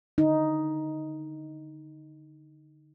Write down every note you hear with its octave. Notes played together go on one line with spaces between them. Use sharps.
D3 D#4